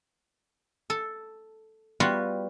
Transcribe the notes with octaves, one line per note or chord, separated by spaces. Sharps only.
A4
G3 B3 F4 F#4